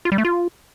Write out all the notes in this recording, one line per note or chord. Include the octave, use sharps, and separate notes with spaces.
F4
G3
A3
F4